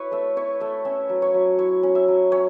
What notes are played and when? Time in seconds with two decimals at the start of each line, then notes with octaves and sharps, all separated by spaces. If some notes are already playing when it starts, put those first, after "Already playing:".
Already playing: E4 B4 C#5
0.11 A3 E5
0.37 E4 C#5
0.60 A3 E5
0.85 C#4 E5
1.09 F#3
1.22 C#5
1.34 F#3
1.58 E4 C#5
1.83 C#4
1.95 E5
2.08 F#3
2.32 C#4 C#5